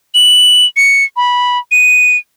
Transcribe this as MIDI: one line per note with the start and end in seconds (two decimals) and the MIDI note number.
0.15 0.65 102
0.77 1.04 97
1.17 1.58 83
1.72 2.17 99